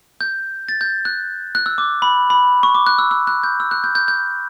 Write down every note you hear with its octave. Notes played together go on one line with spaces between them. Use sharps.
G6
A6
G6
F#6
F#6
E6
D6
B5
B5
C#6
D6
F#6
E6
E6
F#6
G6
E6
F#6
G6
G6
G6